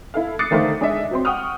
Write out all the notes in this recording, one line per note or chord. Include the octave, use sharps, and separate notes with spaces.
E4 A4 F5
D6 D#6 F#6 A6 C7 C#7
D3 D#3 A3 D#4 C5 F5
G#3 D4 G#4 D#5 E5
F#3 C4 C6
F#5 G5 C#6 D#6 F6